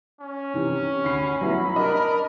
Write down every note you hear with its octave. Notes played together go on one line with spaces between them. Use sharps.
C#4
C3 E3
D2 B5 C7
F#3 B3 E4
D4 A#4 D#5